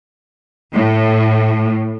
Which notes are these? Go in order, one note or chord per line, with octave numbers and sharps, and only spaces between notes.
A2